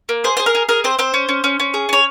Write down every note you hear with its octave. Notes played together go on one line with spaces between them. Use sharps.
A#3
G#4 C5
G#4 C5
A#4
G#4
G#4 A#4
C4 C5
C4 C5
C#4
C#4
C#4
C#4
G#4
C#4 C#5